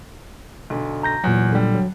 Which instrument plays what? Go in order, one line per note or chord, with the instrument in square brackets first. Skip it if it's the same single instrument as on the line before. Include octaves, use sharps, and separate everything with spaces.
[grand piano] B1 D3
[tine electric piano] A#5 G6 A#6
[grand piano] E2 [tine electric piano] A#2 F#3
[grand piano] D3 G3
[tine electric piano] F#3